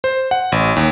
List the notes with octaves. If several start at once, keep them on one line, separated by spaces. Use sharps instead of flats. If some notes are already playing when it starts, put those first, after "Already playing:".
C5
F#5
A1
D#2